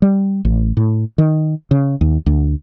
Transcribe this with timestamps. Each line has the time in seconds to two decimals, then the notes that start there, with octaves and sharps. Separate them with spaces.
0.02 G3
0.45 A1
0.77 A2
1.18 D#3
1.71 C#3
2.01 D#2
2.26 D2